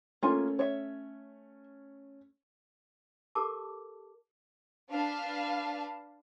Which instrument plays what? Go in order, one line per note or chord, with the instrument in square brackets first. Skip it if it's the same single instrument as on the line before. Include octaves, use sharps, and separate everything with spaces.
[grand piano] A3 C#4 [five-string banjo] A#3 F4 G#5
[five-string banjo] C#5 E5
[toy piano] G4 A4 A#4 A5 D6
[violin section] D4 B4 F5 A5